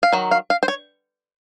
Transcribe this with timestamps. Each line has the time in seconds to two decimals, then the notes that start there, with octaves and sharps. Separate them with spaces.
0.03 F5
0.13 D#3 F#3
0.31 F5
0.50 F5
0.63 C5
0.68 C#5